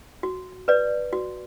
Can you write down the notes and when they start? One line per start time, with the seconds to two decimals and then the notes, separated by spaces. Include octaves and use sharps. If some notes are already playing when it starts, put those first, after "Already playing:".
0.23 F#4
0.68 B4 D5
1.13 F#4